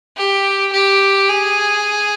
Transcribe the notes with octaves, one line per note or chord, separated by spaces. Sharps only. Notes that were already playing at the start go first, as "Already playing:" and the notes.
G4
G4
G#4